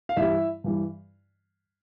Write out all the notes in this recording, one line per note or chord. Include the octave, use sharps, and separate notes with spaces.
F5
G2 E3 G3 E4 E5
G2 E3 G3